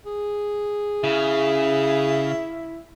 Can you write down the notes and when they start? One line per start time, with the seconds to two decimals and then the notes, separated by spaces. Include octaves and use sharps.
0.05 G#4
1.04 C#3 E4